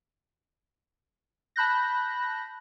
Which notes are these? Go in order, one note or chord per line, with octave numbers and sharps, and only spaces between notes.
A5 B5 F#6 G6 A#6